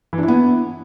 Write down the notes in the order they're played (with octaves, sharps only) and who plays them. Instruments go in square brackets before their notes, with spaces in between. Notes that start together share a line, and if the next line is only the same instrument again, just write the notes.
[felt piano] E3
D4
E4
B3